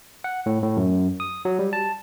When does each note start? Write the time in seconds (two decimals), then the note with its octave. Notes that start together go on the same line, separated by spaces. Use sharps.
0.24 F#5
0.46 A2
0.62 A2
0.77 F#2
1.20 D#6
1.45 F#3
1.59 G3
1.73 A5